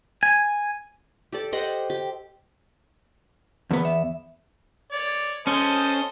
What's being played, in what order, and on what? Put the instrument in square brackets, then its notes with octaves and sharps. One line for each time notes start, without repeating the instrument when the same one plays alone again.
[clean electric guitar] G#5
[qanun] G4 A4 D5
G4 C5 D#5 F#5
G4
[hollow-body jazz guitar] E2 B3
[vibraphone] E5
[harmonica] C#5 D5
[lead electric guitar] C#4 [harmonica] A4 C5 D#5